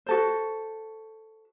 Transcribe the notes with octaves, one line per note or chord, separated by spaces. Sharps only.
F#4 A4 C5